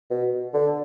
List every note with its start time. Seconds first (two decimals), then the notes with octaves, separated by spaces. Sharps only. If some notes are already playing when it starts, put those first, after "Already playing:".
0.10 B2
0.54 D3